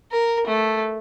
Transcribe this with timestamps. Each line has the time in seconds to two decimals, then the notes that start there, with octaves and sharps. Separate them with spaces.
0.12 A#4
0.47 A3